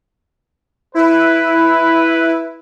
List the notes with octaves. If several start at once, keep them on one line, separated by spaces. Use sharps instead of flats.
E4 B4